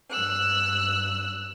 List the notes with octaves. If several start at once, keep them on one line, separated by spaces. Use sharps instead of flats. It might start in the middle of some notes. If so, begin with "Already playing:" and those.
G2 E6 F#6